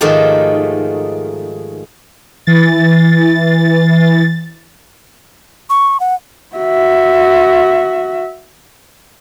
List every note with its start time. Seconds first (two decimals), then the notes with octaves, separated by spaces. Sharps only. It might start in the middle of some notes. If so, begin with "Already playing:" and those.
0.01 G#2 D#3 F3 A3 D#4 G4
2.47 E3 A6
5.70 C#6
6.00 F#5
6.56 F#4 E5